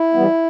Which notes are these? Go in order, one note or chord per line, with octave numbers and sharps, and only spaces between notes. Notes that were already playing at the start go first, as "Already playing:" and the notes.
Already playing: E4
E3 G3 B3